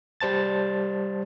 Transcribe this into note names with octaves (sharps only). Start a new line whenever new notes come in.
G3 C5 A5 A6